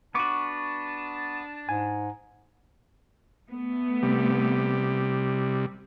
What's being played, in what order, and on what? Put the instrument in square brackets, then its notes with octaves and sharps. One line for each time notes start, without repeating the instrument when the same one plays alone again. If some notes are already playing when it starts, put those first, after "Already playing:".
[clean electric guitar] B3 F#4 [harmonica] D4 A5 [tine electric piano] C#6 D6
[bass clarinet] G#2 [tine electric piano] G#5
[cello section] A3 B3
[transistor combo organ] C3 G3